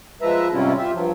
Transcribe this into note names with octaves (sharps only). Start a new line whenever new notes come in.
F3 G#3 B4 E5 A#5
G#2 C3 G3 C#4 E4 F4
F4 G4 E5
G2 F3 F#3